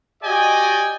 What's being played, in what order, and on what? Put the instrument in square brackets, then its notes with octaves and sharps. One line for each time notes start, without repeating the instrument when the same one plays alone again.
[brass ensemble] F#4 G4 D5 D#5 G5 G#5